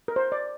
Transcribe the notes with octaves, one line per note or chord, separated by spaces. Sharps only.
A#4
C5
D5